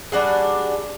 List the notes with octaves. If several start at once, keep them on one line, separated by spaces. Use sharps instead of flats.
G3 D4 F#4 G#4